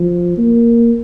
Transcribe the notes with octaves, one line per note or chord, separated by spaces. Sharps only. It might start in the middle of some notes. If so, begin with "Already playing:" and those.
Already playing: F3
A#3